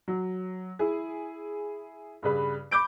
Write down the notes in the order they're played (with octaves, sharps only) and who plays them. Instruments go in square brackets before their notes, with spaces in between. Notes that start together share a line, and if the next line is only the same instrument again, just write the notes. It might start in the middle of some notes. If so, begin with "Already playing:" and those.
[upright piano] F#3
E4 G#4
G2 C#3 B4
B5 D6 G6 D7